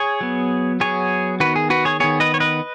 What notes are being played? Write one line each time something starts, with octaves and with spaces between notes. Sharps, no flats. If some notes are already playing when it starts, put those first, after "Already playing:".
Already playing: G#4 C#5
F#3 B3
F#3 B3 G#4 C#5
D#3 B3 F#4 B4
G#4
F#4 B4
G#4 C#5
D#3 B3 G#4 C#5
B4 D#5
C#5
B4 D#5